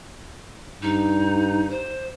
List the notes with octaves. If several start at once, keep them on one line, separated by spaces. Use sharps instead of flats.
G2 D#4
C5